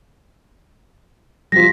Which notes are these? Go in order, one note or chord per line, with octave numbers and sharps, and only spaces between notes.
F3 G3 A#6 B6